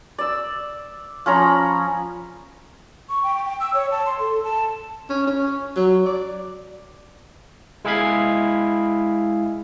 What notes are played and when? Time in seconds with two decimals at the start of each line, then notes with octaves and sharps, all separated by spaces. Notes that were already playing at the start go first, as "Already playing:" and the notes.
0.18 D5 E6
1.26 F3 C#4 A#5 B5
3.08 C#6
3.23 G5
3.45 G5
3.60 E6
3.74 C#5
3.91 A5
4.06 C6
4.19 A4
4.44 A5
5.09 C#4
5.27 C#4
5.76 F#3
6.06 D5
7.85 G#3 E4 G#4 F5 B5 G#6